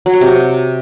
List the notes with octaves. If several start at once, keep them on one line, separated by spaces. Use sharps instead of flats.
F#3
F#4
C3